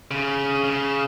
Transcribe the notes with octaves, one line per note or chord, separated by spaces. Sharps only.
C#3
C#3